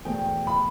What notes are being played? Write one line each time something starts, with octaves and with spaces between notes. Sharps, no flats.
E2 B2 A3 G5
B5